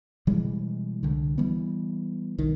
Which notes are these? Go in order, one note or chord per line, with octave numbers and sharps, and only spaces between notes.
B2 E3 G3 G#3
C2 D3
E3 G3 B3
B1 D#3